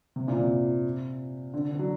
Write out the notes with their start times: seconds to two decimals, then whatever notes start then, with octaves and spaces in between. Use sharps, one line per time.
0.16 C3
0.28 A#2
0.39 C3
1.54 D3
1.71 D3
1.79 F#3